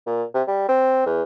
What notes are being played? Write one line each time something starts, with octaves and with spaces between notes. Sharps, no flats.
A#2
C3
G3
C4
E2